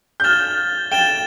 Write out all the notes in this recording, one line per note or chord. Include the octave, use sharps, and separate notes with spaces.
G6
F6 A6 E7 G7
G5 A6 E7 G7